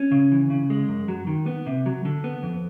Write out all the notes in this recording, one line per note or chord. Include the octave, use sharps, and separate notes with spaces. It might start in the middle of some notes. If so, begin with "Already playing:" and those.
Already playing: C#4
C#3
E3
C#3
G#3
F#2
F#3
D#3
B3
C3
F#3
D3
B3
F2